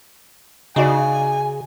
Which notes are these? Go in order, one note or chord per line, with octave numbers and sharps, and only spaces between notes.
C#3 D#4 F#4 D5 G#5